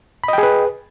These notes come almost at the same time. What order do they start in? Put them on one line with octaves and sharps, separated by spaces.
B5 D#5 G5 G#4 B4